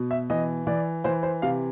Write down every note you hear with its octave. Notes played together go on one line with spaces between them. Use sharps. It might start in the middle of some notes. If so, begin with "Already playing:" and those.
Already playing: B2
E5
E3 D#5
E3 D5
E3 C5
C5
C3 F5